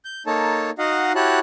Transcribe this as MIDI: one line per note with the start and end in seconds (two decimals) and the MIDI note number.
0.05 0.23 91
0.26 0.71 58
0.26 0.71 63
0.26 0.71 69
0.26 0.71 73
0.26 0.71 81
0.78 1.12 63
0.78 1.12 66
0.78 1.12 75
0.78 1.12 77
0.78 1.12 78
1.15 1.39 64
1.15 1.39 66
1.15 1.39 67
1.15 1.39 73
1.15 1.39 81
1.15 1.39 90